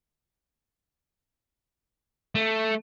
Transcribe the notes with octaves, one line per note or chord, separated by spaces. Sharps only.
A3